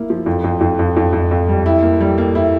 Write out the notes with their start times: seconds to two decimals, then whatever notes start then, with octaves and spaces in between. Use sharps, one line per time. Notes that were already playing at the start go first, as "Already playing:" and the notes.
Already playing: A#3 E4
0.10 F3
0.26 F2
0.44 F2
0.61 F2
0.79 F2
0.97 F2
1.13 F2
1.31 F2
1.49 G3
1.66 E4
1.82 A#3
2.01 G3
2.18 A#3
2.35 E4